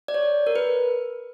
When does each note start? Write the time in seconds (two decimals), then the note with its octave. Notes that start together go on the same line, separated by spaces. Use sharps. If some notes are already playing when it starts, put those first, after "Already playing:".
0.08 D5
0.14 C#5
0.47 A#4
0.56 B4